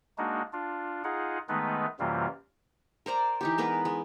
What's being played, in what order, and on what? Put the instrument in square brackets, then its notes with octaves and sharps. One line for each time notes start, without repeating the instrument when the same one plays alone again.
[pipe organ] G#3 A#3 D4 D#4 F#4
D4 F4
D#4 F4 G#4 F#5
D#3 G#3 A3 B3 D#4 B4
F#2 C3 E3 G3 A#3 F4
[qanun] A#4 C5 D5 A#5
E3 D#4 G4
G#3 B3 A#4 B4
G#3